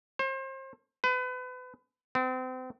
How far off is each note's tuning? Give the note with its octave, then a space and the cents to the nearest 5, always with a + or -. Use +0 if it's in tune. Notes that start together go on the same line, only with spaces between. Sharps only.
C5 +35
B4 +35
C4 -35